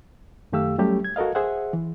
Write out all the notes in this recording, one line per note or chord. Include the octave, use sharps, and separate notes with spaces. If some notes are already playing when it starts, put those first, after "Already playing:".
F#2 D#3 A3 G4 F5 E6
F#3 G3 A3 C#4 G4
G#6
F#4 A4 A#4 D#5 F5
G#4 C5 E5 F#5
E3